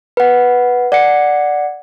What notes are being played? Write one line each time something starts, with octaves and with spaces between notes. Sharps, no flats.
B4 F#5
D5 F#5 C#7